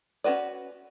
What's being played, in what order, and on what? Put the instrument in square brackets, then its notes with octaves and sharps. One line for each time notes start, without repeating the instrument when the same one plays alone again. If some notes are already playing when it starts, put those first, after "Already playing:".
[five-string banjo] C#4 F4 F#4 B4 D5